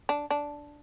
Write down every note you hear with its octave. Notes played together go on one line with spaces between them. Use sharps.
D4
D4